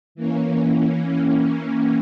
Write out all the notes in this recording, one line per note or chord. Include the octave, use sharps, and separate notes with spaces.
E3 A#3 C#4